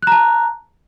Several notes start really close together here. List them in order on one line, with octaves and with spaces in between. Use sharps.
F#6 A#5 A5